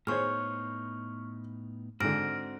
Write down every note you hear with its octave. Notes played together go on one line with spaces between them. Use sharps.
A2 B3 D#4 G#4 C5 C#5 C#6 F6
G#2 D3 C4 F#4 F6 A#6 D7